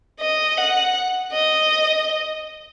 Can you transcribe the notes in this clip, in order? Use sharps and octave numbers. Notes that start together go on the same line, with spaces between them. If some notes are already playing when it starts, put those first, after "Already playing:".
D#5
F#5
D#5